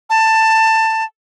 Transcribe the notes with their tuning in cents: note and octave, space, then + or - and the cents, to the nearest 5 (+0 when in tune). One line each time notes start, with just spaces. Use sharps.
A5 +15